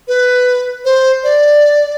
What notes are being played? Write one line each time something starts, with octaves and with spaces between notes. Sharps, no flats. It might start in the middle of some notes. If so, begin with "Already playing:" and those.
B4
C5
D5